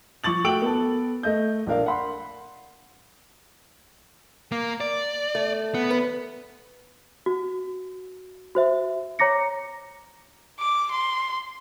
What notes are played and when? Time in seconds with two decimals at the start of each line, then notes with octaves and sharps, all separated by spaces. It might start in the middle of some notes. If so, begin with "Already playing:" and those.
0.24 F3 C#6 D6 A6 F#7
0.44 A3 F#4 G5 E6 D7 F#7
0.62 B3 A4
1.23 A3 D#5 G6
1.67 A#1 D4 A#4 F5
1.86 F#5 B5 C6
4.52 A#3
4.81 D5
5.35 A3
5.74 B3
5.90 E2 B4
7.26 F#4
8.55 F#4 C5 E5
9.19 C#5 A#5 D6 A#6 C#7
10.59 D6
10.91 C6